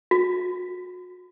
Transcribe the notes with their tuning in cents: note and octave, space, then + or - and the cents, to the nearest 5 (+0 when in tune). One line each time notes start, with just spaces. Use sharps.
F#4 -35